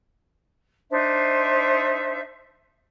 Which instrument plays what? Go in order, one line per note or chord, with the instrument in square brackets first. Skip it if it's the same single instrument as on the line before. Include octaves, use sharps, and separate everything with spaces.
[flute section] D4 D#4 C5 E5